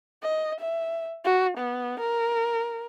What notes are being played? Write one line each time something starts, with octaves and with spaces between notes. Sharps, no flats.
D#5
E5
F#4
B3
A#4